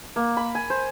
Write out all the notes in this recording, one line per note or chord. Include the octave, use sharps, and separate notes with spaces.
A#3
B5
G#5
C5